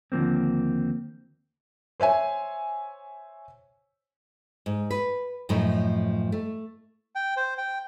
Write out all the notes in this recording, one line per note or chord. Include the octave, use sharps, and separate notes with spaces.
D#2 D3 F3 A#3 C4
C5 C#5 E5 G#5
G#2
B4
F#2 A2 F3 A3 D#4
A3
G5
C5
G5